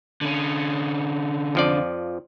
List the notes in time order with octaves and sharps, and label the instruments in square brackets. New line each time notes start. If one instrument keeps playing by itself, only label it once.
[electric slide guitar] D3 C#4
[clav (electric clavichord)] F2 F3 D5